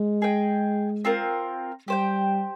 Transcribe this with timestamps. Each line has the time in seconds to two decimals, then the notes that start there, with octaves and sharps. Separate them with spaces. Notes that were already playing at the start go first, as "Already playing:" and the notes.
Already playing: G#3
0.22 G#4 D#5 G5
1.05 C4 F4 A#4
1.87 G3 G4 C5 G5